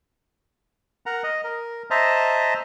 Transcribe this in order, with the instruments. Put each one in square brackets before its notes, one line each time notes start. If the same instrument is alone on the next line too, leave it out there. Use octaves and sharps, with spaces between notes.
[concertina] A#4 F#5 A#5
D#5
A#4
C5 D#5 E5 A5 A#5